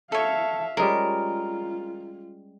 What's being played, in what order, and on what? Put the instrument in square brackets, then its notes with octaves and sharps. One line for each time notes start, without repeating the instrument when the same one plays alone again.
[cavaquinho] A4 C#5 [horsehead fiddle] E5 F5
[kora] G3 G#3 C#4 [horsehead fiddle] F4 [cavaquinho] A#4